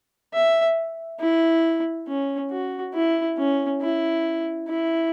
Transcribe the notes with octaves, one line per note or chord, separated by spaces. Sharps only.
E5
E4
C#4
F#4
E4
C#4
E4
E4